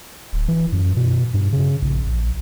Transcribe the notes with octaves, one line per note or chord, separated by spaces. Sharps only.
D1
E3
F#2
B2
G2
C#3
A#1
A#1